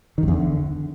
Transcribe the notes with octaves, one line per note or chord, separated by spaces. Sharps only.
D#3
F2
E2
D3